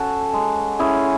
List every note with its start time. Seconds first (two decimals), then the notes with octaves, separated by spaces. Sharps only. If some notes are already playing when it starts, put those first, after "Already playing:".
Already playing: C#4 F#4 A4
0.34 G#3
0.79 C#4 E4 G#4